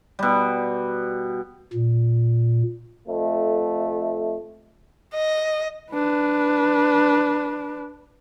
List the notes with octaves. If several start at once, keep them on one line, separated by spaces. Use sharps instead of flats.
B2 G3
A#2
F2 A3
D#5
D4 B4